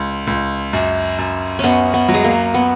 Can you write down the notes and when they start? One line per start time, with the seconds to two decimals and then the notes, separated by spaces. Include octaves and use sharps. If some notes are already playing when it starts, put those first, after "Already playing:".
Already playing: C#2
0.27 C#2
0.73 F#2
1.19 F#2
1.59 F#2 B3 C#4
1.94 B3
2.08 F#3
2.14 G#3
2.24 A#3
2.54 B3